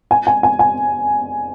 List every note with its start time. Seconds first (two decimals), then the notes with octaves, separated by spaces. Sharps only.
0.11 G#5
0.27 G#5
0.43 G#5
0.59 G#5